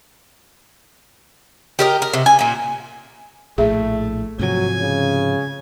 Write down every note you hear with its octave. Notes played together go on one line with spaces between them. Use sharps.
G4 A#4 D#5
A#4
C3
G#5
A#2 A#3
A#1 A2 A3 G#4 E5
G#2 C3 F3 F#3 G#5
C#3